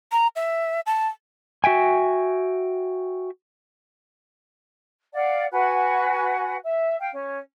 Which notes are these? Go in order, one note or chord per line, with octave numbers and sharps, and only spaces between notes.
A#5
E5
A5
F#4 E5 G5 G#5
D5 F5 F#5
F#4 B4 F#5 G#5
E5
F5 G5
C#4